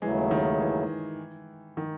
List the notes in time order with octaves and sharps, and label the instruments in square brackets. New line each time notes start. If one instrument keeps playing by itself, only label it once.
[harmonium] D#2 C#3 F#3 A3 [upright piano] E3 G#3
[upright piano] D#3
E3
D#3